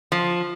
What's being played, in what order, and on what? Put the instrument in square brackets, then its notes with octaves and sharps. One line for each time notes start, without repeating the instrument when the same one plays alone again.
[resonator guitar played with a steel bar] F3